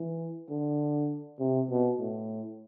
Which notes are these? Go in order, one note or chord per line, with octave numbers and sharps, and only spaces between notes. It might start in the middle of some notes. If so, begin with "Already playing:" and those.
Already playing: E3
D3
C3
B2
A2